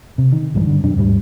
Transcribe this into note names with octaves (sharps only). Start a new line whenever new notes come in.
C3
D#3
A#1 G2 E3 G#3
G2 D3
F#2 B2 F#3 D4
D#2 G#2 G3